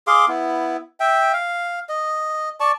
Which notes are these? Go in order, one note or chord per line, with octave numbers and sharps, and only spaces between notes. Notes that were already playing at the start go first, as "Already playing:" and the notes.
G#4 F5 C6 D6
B3 E4
E5 G5
F5
D#5
D5 A5 C#6